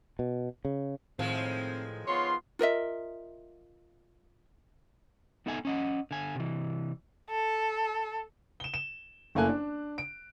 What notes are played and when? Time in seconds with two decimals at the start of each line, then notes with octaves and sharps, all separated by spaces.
0.19 B2
0.65 C#3
1.19 A2 D#3 F3 G#3 C4
2.08 B3 F4 C#5 C6
2.59 F4 A#4 D#5 E5
5.46 B3 D#4 A4 E5 G#5
5.65 C#4 D#5 F#5
6.11 D3 G#5
6.35 C3 E3
7.30 A4
8.60 E7 G7
8.74 E7
9.35 F#1 A3 A#3 E4 G#5 F#6
9.49 D4
9.98 D7